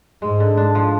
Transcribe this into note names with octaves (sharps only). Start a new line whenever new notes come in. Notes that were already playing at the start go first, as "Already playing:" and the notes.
G#2 G#3
D3
D4
F3